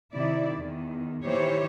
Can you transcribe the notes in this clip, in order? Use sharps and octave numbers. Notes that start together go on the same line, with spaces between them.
C3 D#3 E4 D5
E2 D#3
D#3 E3 A#3 G4 C5 C#5